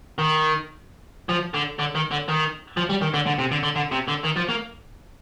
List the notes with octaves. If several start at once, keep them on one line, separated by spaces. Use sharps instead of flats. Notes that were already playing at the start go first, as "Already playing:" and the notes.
D#3
F3
D3
D3
D#3
D3
D#3
F3
G3
D#3
D3
D3
C3
D3
D3
D3
C3
D3
D#3
F3
A#3